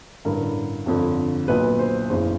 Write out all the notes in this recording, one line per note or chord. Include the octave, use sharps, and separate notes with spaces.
A1 G2 D3 A#4
G1 F2 D3
B1 A#2 B4
C5
F#1 E2 C#3 C5